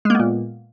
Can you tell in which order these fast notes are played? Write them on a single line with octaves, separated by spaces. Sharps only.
G#3 A#3 B3 A#2